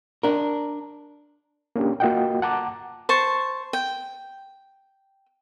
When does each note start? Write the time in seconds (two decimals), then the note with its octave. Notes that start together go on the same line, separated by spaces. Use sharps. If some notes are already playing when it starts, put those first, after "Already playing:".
0.23 D4 A#4
1.76 A#3 C#4 D4 G4
2.00 A#3 F4 F#4 D#5 F#5 G5
2.42 F#5 A5 A#5 D6
3.09 C5 A5 C#6
3.73 G5